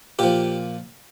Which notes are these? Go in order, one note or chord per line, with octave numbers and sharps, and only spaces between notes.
A#2 F3 G4